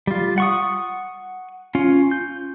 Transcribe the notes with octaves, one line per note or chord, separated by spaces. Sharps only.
G3 F4
F#5 C#6 D#6
C#4 F4
G6